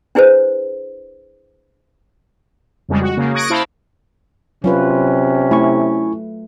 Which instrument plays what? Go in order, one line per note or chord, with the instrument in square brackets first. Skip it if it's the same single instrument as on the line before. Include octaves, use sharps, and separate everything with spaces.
[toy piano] D4 E4 G#4 B4 C5
[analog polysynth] F2 C#3 G3 G#3
F#4
C#3 A#3
C#6 D#6 F#6 G#6 A#6 D7
E4 C5 F5 A5 B5
[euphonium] C3 [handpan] F#3 F4 B4 [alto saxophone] C#4
[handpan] A3 [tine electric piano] E4 G#5 C#6